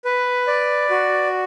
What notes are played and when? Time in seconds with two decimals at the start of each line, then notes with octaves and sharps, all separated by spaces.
0.05 B4
0.47 D5
0.90 F#4